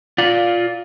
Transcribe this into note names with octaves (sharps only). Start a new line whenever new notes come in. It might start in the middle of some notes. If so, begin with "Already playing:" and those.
F4 D5